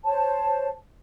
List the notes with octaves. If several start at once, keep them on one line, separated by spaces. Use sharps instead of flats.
C5 C#5 A5